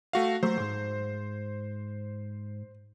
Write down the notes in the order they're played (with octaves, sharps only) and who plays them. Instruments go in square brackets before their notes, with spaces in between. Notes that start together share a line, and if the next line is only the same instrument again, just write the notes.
[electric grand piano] A3 F#4 F5
[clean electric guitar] F#3 A3 [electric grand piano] C5
[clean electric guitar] D#2 G#2